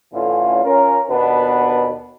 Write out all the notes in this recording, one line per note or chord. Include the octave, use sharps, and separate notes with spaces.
A1 A2 D3 E3 C#4 F4
C#4 F4 A#4
D#2 B2 B3 D4 B4